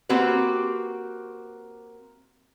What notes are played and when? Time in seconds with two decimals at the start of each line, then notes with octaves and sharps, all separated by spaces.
0.09 A#3 C4 F#4 G4 B4